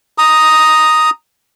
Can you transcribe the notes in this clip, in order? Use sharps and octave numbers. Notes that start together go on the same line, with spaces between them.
A#5 D#6